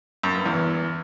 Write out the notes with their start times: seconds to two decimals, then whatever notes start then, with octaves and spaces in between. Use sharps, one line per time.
0.23 F#2
0.35 G2
0.46 E2